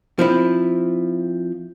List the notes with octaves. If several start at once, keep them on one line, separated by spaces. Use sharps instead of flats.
F3 C4 E4